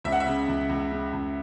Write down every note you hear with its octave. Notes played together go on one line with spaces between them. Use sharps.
C#2 E5
F#5
E5
C#3
C#2
C#2
C#3
C#2